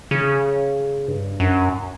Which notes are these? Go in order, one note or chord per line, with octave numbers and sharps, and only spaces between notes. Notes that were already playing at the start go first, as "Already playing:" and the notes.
C#3
G2
F#2